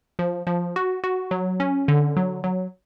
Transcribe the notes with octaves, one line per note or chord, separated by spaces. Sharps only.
F3
F3
F#4
F#4
F#3
C#4
D3
F#3
F#3